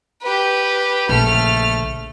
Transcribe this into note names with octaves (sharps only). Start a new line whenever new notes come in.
G4 B4
A#1 C#3 A3 F6